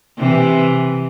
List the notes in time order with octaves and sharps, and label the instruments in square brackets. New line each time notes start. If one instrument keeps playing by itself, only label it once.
[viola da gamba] C3 E3